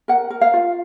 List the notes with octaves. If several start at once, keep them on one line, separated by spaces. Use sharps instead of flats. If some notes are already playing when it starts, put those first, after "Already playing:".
A#4 F#5
A#4
F5
F4